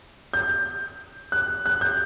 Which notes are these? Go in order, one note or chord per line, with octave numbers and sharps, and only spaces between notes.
G6
F#6
F#6
G6